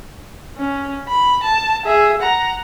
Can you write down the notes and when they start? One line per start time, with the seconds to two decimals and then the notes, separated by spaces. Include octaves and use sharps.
0.58 C#4
1.08 B5
1.43 A5
1.85 G#4 E5
2.21 F#5 A#5